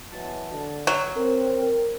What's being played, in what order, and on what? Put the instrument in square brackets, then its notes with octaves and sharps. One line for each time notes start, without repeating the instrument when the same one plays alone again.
[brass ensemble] B2 E3 F#3 [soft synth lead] A5
[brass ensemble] D3
[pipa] F#3
[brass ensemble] C4 [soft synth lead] A#4
[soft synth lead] A#4